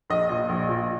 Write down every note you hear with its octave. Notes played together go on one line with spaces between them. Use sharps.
A#1 D#5
A#2 D#5
A#1
A#2